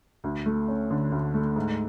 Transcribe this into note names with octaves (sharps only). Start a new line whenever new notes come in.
D2
A3
C#4
D3
D2
A3
G#2